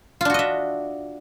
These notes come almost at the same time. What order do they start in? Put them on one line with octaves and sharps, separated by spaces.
F4 D4 F#4 D#5 E5